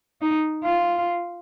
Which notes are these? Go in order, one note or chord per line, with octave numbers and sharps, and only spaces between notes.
D#4
F4